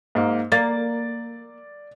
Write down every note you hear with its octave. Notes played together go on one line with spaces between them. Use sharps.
G#2 A#3
A#3 D5 A6